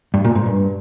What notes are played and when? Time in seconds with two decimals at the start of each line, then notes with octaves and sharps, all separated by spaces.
0.14 G2
0.25 A#2
0.35 G#2
0.46 G2